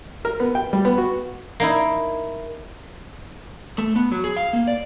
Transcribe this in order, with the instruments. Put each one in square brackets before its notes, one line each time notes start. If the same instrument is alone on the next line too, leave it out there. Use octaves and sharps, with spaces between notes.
[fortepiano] A#4
B3
G5
G3
B3
F#4
[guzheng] A#3 D#4 E4
[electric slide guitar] A3
B3
F#3
G#4
F5
A#3
D5